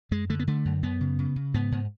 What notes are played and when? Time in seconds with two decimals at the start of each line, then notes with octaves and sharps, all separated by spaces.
0.11 F#2 G#3
0.30 D3 A3
0.39 B3
0.47 D3 A3
0.65 F#2
0.83 F#2 B3
1.01 C#3
1.19 C#3
1.36 C#3
1.54 G#2 B3
1.72 G#2